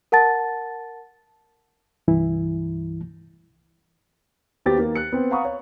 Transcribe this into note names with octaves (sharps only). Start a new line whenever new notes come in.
A#4 F#5 A5 A6
C2 G2 E3 E4
D#2 B3 F#4 G4 C5 A6
D#3 A#3
F#6 C#7
B3 C4
F5 F#5 A#5 B5 C#6 D#6
C#5